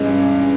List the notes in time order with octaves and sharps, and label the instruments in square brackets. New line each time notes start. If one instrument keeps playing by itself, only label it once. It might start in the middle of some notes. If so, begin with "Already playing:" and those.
Already playing: [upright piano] G2 E3 G#3 [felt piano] C#4 E4